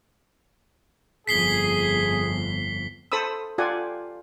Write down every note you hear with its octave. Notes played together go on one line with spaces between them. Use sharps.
G1 F2 G#4 B6 C7 G7
A4 C5 B5 D#6 E6
F4 G4 A4 D5 F#5 G#5